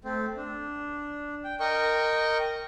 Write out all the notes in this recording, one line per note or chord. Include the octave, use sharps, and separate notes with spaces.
A3 C4
D4
G5
A#4 D#5 G5 C#6